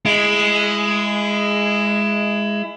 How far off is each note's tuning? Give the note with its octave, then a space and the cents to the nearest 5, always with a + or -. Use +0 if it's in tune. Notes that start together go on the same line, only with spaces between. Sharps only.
G#3 +0 E4 +25